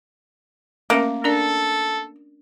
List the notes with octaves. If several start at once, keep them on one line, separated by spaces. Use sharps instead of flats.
A3 A#3 C#4 E5
D4 A4 A#4 D5